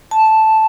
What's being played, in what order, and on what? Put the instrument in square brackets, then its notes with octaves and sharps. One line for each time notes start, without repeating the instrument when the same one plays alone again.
[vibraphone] A5